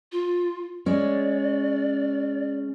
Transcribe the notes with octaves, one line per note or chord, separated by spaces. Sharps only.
F4
G#3 C#4 D5